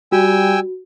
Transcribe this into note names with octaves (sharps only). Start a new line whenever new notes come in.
G3 F#4 G5 G#5 E6